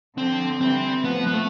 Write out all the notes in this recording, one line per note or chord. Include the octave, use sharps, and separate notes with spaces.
D3 F3 C4
E3 G3 C4
F3 A3 B3
B3
A3